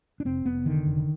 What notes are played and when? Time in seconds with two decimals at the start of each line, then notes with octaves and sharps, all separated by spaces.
0.20 D4
0.25 F1 C4
0.46 F1 B3
0.65 D3 D#3
0.86 F1